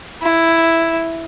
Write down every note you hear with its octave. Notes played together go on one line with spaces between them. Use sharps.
E4